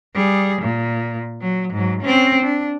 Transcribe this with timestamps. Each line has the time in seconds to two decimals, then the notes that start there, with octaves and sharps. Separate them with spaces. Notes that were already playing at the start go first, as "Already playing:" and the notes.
0.15 G3 G#4
0.62 A#2
1.41 F#3
1.73 G#2 F#3
2.01 C4 C#4
2.43 D4